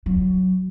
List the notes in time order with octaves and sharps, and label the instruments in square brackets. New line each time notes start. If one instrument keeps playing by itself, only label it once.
[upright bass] F#3